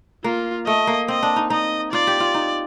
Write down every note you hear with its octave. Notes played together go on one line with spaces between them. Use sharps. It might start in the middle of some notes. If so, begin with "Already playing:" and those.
A#3 F4
A3 D#5
A#3
C4 D#5
D4
D#4
D#4 D#5
F4 D5
G4
F4
D#4